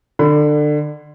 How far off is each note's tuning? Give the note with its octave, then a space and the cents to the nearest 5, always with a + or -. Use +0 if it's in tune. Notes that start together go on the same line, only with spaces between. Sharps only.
D3 +25 B5 +25